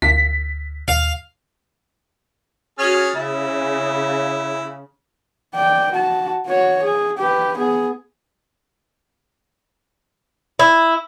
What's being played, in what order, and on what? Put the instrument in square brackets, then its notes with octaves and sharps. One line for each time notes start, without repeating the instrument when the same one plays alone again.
[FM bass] D2 [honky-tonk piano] B6
[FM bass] D#2 [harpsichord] F5
[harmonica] C#4 G#4 F6 [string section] F#4 A6
[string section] C#3 [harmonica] E4
[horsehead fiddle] D5 G5
F#4 A5
F#4 C#5
G#4
G4 B4
B3 G#4
[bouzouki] E4